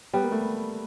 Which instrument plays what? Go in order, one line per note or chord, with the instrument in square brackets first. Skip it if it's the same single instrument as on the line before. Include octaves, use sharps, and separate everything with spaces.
[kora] G3 [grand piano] B3
[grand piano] A#3
A3